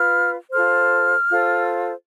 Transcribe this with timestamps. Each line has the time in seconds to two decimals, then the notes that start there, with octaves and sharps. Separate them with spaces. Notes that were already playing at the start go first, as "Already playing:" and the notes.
Already playing: F4 B4 F6
0.52 F4 A4 C5 F6
1.31 F4 A4 C5